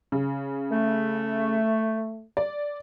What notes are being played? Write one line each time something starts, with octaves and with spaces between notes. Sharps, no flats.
C#3
A3
D5